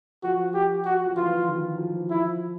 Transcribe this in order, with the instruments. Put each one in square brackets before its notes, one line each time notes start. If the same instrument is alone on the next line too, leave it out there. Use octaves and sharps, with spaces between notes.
[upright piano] F3 [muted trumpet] F#4
[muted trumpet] G4
F#4
[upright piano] F3
[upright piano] E3 [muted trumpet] F4
[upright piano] D#3
F3
[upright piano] F3 [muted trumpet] E4